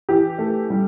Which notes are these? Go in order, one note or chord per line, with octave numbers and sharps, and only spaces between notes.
E3 G4
A3
G3